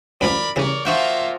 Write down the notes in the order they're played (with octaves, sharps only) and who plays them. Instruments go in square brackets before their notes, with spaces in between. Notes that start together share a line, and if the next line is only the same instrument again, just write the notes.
[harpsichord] F#2 E3 F3 [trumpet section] A#4 D5 B5
[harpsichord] C#3 E3 G3 [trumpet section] A#4 C#5 D5
[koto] F3 F#4 G5 [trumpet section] A#3 F4 E5